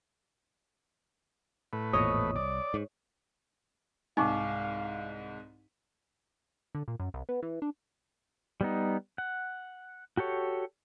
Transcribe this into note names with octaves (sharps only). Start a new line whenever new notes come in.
A2 B4
G#1 E2 A#2 C#5 D#5 D#6
C2 D5
G#2
C2 G#2 D#4 F5 G#5 C#6 D6
D3
A#2
F#2
C2
B3
E3
D4
G3 B3 D#4
F#5
F#4 G4 A4 C#5